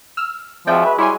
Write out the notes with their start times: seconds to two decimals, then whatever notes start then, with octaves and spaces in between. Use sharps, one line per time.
0.17 E6 F6
0.67 F3 F#3 G#3 C4 D5 E5 G5
0.85 B4
0.98 G3 E4 C#5 G#5 C6